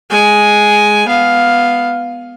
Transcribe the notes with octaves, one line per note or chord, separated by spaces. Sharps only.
G#3 G#5
B3 F5